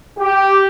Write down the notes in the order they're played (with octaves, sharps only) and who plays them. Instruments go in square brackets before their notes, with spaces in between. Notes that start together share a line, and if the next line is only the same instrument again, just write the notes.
[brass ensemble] G4